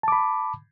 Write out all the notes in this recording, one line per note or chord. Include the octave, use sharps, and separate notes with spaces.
A5 B5 D6